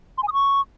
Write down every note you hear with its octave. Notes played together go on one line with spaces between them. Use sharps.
C6
G#5
D#6
C#6